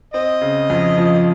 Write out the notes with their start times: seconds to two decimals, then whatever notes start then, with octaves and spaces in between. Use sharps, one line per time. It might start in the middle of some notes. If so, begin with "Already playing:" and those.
0.14 C4 D#5
0.41 C#3
0.70 F2
0.98 F3